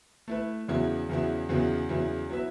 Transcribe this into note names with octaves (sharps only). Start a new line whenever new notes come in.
A3 E4 B4
E2 C#3 F#3 B3 E4
E2 C#3 F#3 B3 E4
E2 C#3 F#3 B3 E4
E2 C#3 F#3 B3 E4
F#3 B3 E4 B4 E5